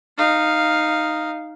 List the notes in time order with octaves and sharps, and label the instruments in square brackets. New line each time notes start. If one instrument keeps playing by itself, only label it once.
[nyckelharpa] D#4 F5